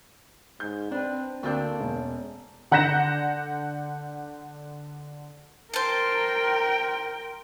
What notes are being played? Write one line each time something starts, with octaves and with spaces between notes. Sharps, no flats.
G#2 G6
C4 D4 B4
D2 A3 A#3 C4 D4 G5 G6
E1 C#4
D3 F#5 F#6 G6 A#6 E7
A#4 C5 G5 A5